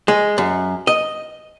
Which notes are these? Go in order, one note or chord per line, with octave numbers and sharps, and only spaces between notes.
G#3
F#2
D#5